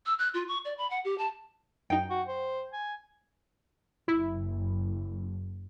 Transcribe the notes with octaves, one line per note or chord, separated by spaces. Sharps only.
E6
F#6
F4
C#6
D5
B5
F#5
G4
A5
F#2 D#4 G5
F#4
C5
G#5
F#1 E4